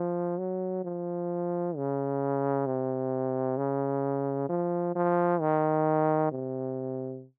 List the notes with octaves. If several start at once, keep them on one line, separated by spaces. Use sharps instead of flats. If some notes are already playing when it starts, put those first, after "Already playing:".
Already playing: F3
F#3
F3
C#3
C3
C#3
F3
F3
D#3
C3